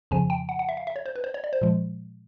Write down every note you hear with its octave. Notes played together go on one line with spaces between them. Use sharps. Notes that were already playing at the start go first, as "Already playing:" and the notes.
F2 C#3 F3 G#5
G5
F#5
F#5
E5
F5
E5
C#5
C5
B4
C5
C#5
D5
C5
A#2 F3 G#3